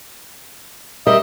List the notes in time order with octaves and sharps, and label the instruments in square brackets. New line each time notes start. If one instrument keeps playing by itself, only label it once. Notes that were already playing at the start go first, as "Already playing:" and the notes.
[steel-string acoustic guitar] G3 A#4 E5 [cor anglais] D#5